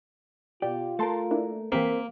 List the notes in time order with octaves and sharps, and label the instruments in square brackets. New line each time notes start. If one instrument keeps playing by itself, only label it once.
[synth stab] B2 D5 [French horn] F4 [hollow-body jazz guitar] G4
[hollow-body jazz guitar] A3 A#4 [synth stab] A5 C6 A6
[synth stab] A#3 D4 E4
[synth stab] E3 G4 B6 [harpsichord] A#3 [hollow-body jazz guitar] C4 [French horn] A#4